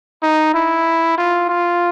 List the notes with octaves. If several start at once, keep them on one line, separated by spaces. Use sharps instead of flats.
D#4
E4
F4
F4